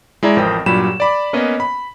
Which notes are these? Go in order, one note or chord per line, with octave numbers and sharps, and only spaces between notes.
G#3 E4 D5 A#5
A1 F2 A#4 C5 G5 D#6
G2 A#2 F#3 G3 B5 E7
D5 B5 D6
A#3 B3 C#4 B4 D#5
B5